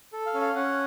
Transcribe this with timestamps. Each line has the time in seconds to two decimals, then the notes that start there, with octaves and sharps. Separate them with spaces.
0.13 A4
0.26 F5
0.34 C#4
0.41 F5
0.55 C#4 F#5